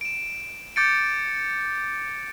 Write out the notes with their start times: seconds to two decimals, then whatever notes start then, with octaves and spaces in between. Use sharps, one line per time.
0.01 D7 E7
0.76 D6 G6 A6 C#7 D7